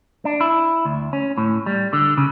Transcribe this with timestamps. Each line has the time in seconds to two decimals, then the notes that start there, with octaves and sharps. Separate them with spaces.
0.25 D4
0.41 E4
0.85 D2
1.13 C#4
1.38 A2
1.66 G3
1.93 D3
2.18 C#3